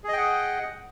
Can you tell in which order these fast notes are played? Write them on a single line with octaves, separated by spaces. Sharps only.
G#4 D#5 G5 F#5